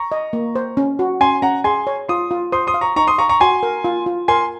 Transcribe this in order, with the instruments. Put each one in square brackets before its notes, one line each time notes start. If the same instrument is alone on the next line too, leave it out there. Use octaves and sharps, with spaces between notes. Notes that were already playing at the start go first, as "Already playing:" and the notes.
Already playing: [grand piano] A#5 C#6
[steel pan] D#5
A#3
C5
C#4
F#4
[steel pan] C#4 [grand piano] G#5 C6
[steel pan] C#4 [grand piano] F#5 A#5
[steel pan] G#4 [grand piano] G#5 C6
[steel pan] C#5
[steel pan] F4 [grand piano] C6 D#6
[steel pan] F4
[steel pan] C5 [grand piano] C6 D#6
[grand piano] C6 D#6
[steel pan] F5
[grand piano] A#5 C#6
[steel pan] D#4 [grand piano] A#5 C#6
[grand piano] C6 D#6
[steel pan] F5 [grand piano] A#5 C#6
[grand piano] A#5 C#6
[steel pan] F#4 [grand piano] G#5 C6
[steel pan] A#4
F4
F4
[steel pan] A#4 [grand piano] G#5 C6